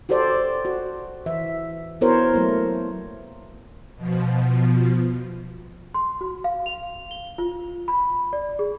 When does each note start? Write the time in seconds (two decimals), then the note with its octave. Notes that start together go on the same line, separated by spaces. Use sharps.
0.09 F#4 G4 A4 C5 D5
0.65 F#4
1.26 E3 E5
2.01 B3 E4 F#4 A#4 C5 C#5
2.34 F#3 A3 A#3
3.96 B2 F3
5.95 C6
6.21 F#4
6.44 F5
6.66 F7
7.11 G7
7.38 F4
7.88 B5
8.33 D5
8.59 G#4